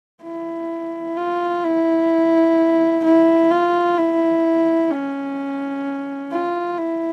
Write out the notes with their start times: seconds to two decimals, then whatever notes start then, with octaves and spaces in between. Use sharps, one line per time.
0.23 E4
1.17 F4
1.64 E4
3.04 E4
3.51 F4
3.98 E4
4.91 C#4
6.32 F4
6.78 E4